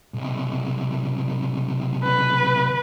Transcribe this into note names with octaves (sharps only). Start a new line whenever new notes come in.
B1 C3
B4